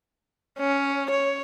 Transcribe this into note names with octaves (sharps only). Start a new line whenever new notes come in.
C#4
C#5